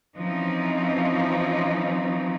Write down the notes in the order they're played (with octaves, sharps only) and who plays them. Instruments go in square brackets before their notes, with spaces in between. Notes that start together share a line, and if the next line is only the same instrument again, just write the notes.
[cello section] E3 F3 C4 C#4 D#4